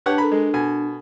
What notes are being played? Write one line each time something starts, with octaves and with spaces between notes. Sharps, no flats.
D4 G4 B4 C#5 F#5 A5
A4 A#4 A#5 B5
G#3 A4
B2 G#5